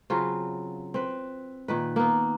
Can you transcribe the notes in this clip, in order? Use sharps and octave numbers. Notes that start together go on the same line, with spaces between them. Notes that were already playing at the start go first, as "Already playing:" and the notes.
C#3 F#3 C4 F4
C4 B4
A#2 D#3 B4
A#3 B3